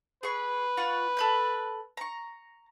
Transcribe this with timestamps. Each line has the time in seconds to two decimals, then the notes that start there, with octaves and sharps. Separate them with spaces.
0.23 G#4 B4 C#6
0.77 F4 F#5 C#6
1.17 A4 B5 G6
1.97 A#5 C#6